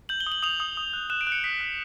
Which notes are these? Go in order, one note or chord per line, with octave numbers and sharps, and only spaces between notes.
G6 F#7
G7
D#6
F#7
D#6 F7
D#6
D#6
F#6
F#6 E7
D7
F#6
C#7
D#6 B6
F#6